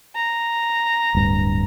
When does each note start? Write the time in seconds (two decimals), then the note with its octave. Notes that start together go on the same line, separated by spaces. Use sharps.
0.16 A#5
1.15 D1 G2